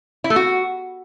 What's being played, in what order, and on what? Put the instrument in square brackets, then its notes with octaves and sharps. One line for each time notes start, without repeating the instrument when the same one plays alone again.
[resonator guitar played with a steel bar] E4
A3
F#4